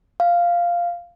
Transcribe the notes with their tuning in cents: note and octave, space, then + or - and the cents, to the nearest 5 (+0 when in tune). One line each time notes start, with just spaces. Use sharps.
F5 -5